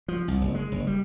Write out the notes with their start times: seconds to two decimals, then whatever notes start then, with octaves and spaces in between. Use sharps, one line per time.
0.08 F3
0.28 C2
0.41 F#1
0.55 G#3
0.72 F#1
0.87 G3